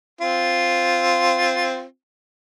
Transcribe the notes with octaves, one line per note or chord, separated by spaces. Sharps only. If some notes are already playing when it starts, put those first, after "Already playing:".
C4 F4